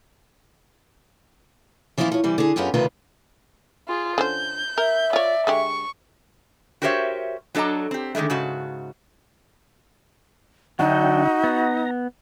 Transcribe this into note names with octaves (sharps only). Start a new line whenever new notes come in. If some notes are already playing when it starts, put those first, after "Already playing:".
E3 F3 A#3 D4 E4 F4
F3 C#5
C3 E3 G3
D3 G#4
F#2 B3 F4 G4 G#4
D2 C3 D#3 F4 B4
F4 G#4
D3 C#4 C5 G6
A#4 E5
F4 C#5 D5
D3 G#3 G4 C#6
F#4 G4 A#4 C5 C#5 E5
F#3 D4 A4 D#5 A5 A#5
C4 G4
D3 D#3 F3 G#3 A3
G#2 C#3 F#4 A5
D3 F#3 D4 D#4 F#4 E5 G5
B3 A#5